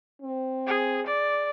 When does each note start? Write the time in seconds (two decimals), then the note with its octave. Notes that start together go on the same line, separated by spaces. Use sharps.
0.22 C4
0.66 G#4
1.07 D5